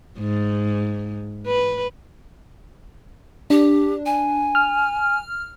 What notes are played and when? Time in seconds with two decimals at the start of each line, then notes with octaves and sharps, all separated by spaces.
0.20 G#2
1.47 B4
3.50 D4 G4
4.06 G#5
4.55 F6